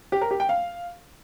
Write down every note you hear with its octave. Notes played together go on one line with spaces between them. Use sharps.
G4
A#4
G4
G5
F5